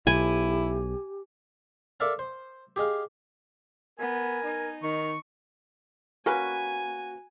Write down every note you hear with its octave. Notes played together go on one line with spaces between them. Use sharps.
B1 E4 G4 G#5
A4 A#4 D5 E5 F5 A5
C5
G4 G#4 D#5 F5
B3 A#4 G#5
D#4
D#3 C#6
A#3 C#4 F#4 B4 G#5